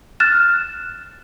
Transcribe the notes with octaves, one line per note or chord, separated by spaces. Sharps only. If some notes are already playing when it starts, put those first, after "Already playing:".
F6 F#6 A6 E7